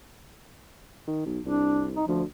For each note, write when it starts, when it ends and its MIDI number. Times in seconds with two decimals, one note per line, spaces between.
1.08 1.23 51
1.26 1.40 35
1.46 2.00 36
1.46 1.86 62
1.96 2.05 63
2.08 2.23 38
2.08 2.22 53